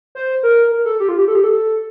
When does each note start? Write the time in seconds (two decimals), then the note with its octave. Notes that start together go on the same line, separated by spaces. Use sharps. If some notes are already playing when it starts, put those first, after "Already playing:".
0.15 C5
0.43 A#4
0.72 A#4
0.85 A4
1.00 G4
1.09 F4
1.18 G4
1.28 A4
1.35 G4
1.44 A4